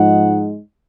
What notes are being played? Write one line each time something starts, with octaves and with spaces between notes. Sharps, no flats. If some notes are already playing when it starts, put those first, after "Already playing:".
Already playing: G#2 F3 G#3 D#4 F#5